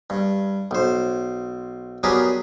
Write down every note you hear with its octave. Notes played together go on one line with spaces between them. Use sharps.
G2
B1 C5
F#3 B3 D4 G4 G#4 A#4